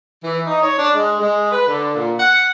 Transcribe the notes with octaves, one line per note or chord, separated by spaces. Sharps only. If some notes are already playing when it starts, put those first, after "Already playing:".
E3
D#4
C#5
D4
G#3
G#3
B4
D3
A#2
F#5